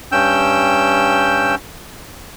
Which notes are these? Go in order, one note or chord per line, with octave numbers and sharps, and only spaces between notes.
G2 C#4 G5 E6 G6